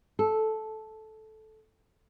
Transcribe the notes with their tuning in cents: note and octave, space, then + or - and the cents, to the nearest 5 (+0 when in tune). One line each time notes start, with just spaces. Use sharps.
A4 -10